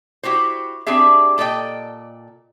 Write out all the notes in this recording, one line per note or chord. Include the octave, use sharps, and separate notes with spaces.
E4 F#4 G4 C5
C4 D4 G4 G#4 E5
A#2 A4 D5 D#5 G5